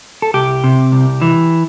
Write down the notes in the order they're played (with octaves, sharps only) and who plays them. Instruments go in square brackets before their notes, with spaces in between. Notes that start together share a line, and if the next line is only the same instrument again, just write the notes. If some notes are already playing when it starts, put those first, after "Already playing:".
[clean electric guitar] A4
C2 G4
C3
C2
E3